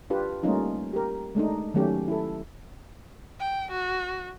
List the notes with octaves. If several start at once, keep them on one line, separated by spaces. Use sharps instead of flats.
D4 F4 G4 B4
G3 A3 A#3 C#4 D#4 F4
G4 A#4
G#3 A3 D4 D#4
D#3 F#3 A3 C#4 G4
E4 A4
G5
F#4